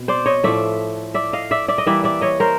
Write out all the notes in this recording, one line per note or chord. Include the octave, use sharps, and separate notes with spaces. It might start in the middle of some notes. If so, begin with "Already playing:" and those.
Already playing: B2 C4
C5 D5
C#5 D#5
A2 F3 A3 D5 E5
D5 E5
D#5 F5
D5 E5
D5 E5
D#5
E3 G3 A#3 D5 E5
D5 E5
C#5 D#5
A#4 C5